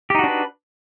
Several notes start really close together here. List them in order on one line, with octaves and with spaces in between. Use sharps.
G4 D#4 F#4 D4 B4